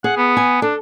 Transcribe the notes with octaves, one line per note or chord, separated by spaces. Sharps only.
G#4 F#5
B3
G#5
D4 A4